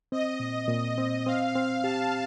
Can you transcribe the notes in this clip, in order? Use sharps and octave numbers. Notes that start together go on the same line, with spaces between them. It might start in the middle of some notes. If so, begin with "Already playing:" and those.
C4 D#5
A#2
A#2
C4
C4 F5
C4 F5
G4 A5